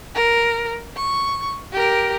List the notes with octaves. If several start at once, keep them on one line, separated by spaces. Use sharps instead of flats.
A#4
C#6
G4 A#4